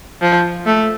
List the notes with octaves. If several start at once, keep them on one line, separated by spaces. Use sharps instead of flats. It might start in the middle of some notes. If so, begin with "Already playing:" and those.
F3
A3